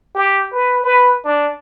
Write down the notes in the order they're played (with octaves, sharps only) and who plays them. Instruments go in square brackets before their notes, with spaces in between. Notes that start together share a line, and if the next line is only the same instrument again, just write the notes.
[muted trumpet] G4
B4
B4
D4